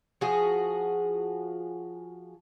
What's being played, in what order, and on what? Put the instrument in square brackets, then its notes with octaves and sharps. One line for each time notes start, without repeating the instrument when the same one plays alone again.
[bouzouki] F3 F#4 G#4